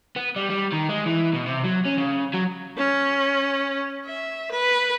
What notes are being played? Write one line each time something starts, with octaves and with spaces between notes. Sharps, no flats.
B3
G3
G3
D#3
G#3
E3
B2
C3
F#3
C#4
C#3
F#3
C#4
E5
B4